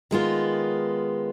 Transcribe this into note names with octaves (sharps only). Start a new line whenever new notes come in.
D#3 G#3 B3 F4